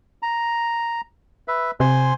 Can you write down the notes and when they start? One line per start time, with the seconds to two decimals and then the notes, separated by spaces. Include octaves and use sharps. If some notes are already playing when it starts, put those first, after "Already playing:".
0.22 A#5
1.48 B4 E5
1.80 C3 C5 G#5 C6